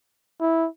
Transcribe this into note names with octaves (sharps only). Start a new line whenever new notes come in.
E4